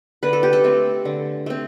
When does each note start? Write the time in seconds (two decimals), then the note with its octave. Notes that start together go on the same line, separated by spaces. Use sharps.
0.23 D3 B4
0.33 A4
0.43 G4
0.53 A4
0.64 A3 C4
1.05 D3
1.46 A3 C4